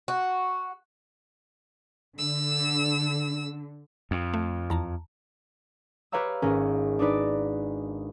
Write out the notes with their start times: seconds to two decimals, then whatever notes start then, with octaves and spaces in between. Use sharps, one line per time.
0.08 F#4
2.18 D3 E6
4.11 F2
4.34 A3
4.70 E2 A5 A#5
6.12 G4 B4 C#5 F5 A#5 E6
6.42 G#1 C#4 A#4
6.99 D4 D#4 B4 D5